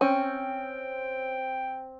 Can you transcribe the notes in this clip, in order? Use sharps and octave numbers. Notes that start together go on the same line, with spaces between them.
C4 C#4 G5